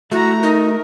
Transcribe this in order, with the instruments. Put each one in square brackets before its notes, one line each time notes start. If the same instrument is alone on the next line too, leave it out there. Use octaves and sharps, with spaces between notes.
[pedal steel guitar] A3 [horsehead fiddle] E4 A#5 [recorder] F#4
[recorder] D#4 [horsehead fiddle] A#4